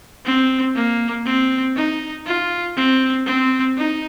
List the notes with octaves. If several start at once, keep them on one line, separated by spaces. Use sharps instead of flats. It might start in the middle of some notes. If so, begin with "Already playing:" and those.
C4
A#3
C4
D#4
F4
C4
C4
D#4